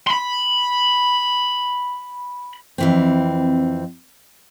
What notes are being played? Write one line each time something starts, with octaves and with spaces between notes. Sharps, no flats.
B5 C6
F2 E3 C4